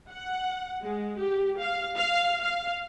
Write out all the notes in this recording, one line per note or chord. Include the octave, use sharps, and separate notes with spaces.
F#5
G#3
G4
F5
F5
F5